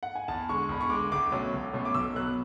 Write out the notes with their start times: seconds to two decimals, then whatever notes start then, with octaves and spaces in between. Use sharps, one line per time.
0.03 F#5
0.15 G#5
0.28 E2 A5
0.49 D3 G#3 C#6
0.69 E2 B5
0.81 C#6
0.90 D3 G#3 D6
1.11 C#2 D6
1.31 B2 F#3 A3 C#4
1.52 C#2
1.73 B2 F#3 A3 C#4
1.85 D6
1.94 B1 E6
2.16 B2 F#3 B3 F#6